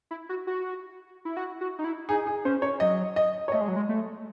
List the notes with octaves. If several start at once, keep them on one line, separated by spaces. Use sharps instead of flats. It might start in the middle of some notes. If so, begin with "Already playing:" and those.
E4
F#4
F#4
E4
F#4
F#4
D#4
E4
D#4 G#4
G#4
C#4 C5
C#5
F#3 D#5
D#5
C#5
A3 D#5
G#3
F#3
G#3
A3